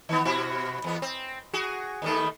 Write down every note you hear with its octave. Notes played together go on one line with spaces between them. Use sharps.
D#3 B3
B2 E4 F#4
E2 B3
C4
F#4 G#4
D#2 D#3 A3